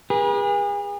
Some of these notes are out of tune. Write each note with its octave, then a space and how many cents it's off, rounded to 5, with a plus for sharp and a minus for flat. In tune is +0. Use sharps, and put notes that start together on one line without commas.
G#4 -40 B4 -40